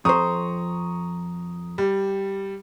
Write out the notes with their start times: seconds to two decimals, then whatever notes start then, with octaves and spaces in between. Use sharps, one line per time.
0.05 F2 C5 A#5 C#6 D#6
1.78 G3